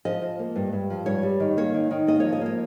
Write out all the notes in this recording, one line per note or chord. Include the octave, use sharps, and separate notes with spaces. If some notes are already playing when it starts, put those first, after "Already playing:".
F3 D#5
F3
A#3
G2
G2
F3
G2 C#5
G3
D#3
A#3 C#5
D#3
D#3
A#3 D#5
F3 C#5
D#5
A#3 C#5